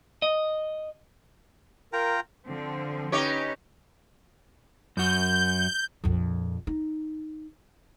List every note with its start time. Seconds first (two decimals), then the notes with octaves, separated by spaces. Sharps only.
0.22 D#5
1.93 F4 A#4 G5 A#5
2.47 D3 F3 C4
3.12 C#4 D#4 G4 B4 C#5
4.97 F#2 F#4 G6
6.04 A#1 F2
6.67 D#4